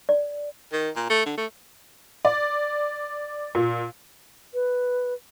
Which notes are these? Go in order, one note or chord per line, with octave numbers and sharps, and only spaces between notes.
D5
D#3
A#2
A3
D3
A3
D5
A#2
B4